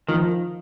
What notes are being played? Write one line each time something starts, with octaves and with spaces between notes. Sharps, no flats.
D#3 F3